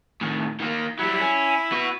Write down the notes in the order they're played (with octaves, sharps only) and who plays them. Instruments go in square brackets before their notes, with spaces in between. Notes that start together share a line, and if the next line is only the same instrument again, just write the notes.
[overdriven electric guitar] A2 D#3
D#3 A#3
[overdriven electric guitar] F#3 G3 [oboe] E4
[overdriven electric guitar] C#4
B3 F#4